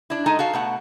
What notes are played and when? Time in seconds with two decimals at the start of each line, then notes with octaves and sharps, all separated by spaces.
0.10 D4 E4
0.26 G#3 D#4 A4 D#5 G#5
0.39 F#4 A4 F5
0.53 B2 A3 F#5